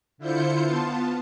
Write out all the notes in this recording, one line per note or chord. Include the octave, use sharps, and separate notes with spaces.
D3 E4 F4 C5 G6 C#7
B3 F4 A5